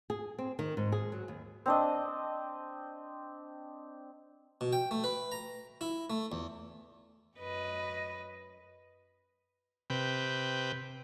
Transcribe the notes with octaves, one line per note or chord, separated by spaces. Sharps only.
G#4
C4
D#3
G#2
G#4
F#3
D#2
C4 D4 D#5
B2
G5
A3
B4
A#5
E4
A3
E2
F#2 B4 D#5
C3 B4 G5